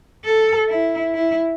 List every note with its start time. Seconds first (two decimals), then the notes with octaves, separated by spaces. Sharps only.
0.25 A4
0.69 E4
1.14 E4